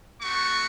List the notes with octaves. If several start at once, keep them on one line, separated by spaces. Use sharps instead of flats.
A3 C4 F#4 C#6